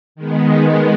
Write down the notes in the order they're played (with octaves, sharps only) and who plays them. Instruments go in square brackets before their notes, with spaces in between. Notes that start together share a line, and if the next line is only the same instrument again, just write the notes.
[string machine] D#3 G#3 B3